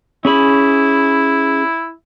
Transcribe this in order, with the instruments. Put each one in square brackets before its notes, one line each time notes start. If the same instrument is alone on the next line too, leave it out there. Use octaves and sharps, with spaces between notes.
[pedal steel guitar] C#4 G#4 B5 [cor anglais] E4